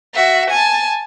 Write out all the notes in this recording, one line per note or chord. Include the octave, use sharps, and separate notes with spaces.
F#4 E5
G#5 A5